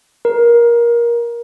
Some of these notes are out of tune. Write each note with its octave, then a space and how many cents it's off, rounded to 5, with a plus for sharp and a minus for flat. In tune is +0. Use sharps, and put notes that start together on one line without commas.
A#4 +20